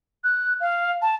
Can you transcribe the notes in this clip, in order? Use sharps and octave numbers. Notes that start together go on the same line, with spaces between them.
F#6
F5
A5